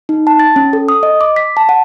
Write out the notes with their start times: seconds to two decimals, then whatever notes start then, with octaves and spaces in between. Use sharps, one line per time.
0.09 D#4
0.27 A5
0.40 A6
0.56 C#4
0.73 A4
0.89 D#6
1.03 D#5
1.21 D6
1.36 B6
1.57 A5
1.69 F#5